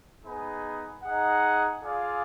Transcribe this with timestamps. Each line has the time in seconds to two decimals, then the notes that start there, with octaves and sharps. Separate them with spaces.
0.24 B3 D#4 G#4 B4
1.04 D#4 G#4 D#5 F#5
1.83 F4 G#4 D5 F5